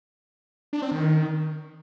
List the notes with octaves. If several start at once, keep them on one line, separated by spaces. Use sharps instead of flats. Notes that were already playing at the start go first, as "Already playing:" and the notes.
D4
C4
D#3